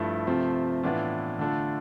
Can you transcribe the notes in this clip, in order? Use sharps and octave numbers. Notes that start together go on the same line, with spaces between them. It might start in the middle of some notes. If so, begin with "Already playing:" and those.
Already playing: G2 F3 A3 E4
C3 F3 A3 C4 F4
A2 E3 B3 D4 F4
D3 A3 D4 F4